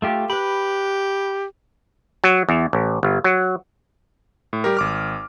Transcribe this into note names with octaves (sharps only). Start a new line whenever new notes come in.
A3 F4 G4
G4 B4 B5
F#3
E2
A1
G1
F#3
A2
G3 G4 A#4
G#1 D6 F6